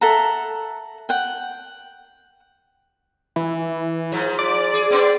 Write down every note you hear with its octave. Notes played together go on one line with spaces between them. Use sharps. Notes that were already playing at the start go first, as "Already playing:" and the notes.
A4 E5 F#5 A#5
F#5 G5
E3
G#2 F3
D5
G#4
B3 C4 D4